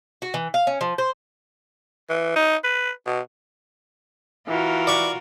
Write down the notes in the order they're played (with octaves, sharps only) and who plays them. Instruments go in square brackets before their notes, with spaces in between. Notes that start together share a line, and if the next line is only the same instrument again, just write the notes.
[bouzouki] F#4
E3
F5
C#4
F3
C5
[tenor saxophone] E3
D#4
B4
B2
[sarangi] E3 [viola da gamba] F4 F#4 A#4
[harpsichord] D5 C#6